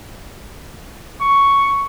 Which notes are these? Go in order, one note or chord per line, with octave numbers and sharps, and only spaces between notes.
C#6